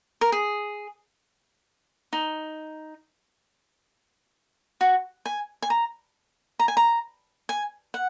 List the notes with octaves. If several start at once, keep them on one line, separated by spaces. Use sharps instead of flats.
A#4
G#4
D#4
F#4
G#5
G#5
A#5
A#5
G#5
A#5
G#5
F#5